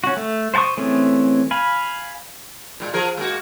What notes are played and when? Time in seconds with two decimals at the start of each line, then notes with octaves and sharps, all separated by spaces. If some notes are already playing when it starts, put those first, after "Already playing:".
0.04 C#4 F#4
0.17 A3
0.54 C5 F#5 A5 C#6 D#6
0.77 E3 A3 C4 C#4 G#4
1.51 F5 G#5 B5
2.80 A#2 G3 G#3
2.94 F3 G#4 A#4
3.17 G#3 A#3 F#4